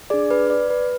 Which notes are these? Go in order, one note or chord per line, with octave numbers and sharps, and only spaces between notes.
D4 G#4 D5
B4
D5
B4